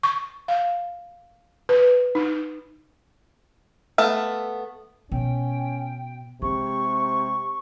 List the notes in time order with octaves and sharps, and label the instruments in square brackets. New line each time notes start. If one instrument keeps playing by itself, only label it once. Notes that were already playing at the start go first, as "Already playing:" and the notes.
[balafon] C#6
F5
B4
D#4
[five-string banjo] A3 B3 A4 F5
[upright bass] B2 [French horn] C#4 [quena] G5
[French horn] C3 [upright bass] G#3 [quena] C#6